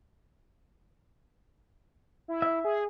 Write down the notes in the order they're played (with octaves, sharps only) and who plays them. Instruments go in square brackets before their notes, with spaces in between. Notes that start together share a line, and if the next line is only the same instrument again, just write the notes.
[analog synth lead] E4
[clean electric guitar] E5
[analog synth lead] G#4